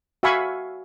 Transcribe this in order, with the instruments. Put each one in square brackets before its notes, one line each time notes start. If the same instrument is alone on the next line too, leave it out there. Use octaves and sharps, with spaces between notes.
[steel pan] F#4 E5 F5 G#5 B5 C#6